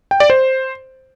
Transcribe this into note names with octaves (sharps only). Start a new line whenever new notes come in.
G5
D5
C5